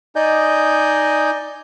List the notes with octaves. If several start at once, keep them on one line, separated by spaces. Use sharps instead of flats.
D#4 D5 D#5 G#5 G6